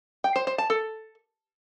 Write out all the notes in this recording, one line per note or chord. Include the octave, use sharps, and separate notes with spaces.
G5
C5
C5
A5
A4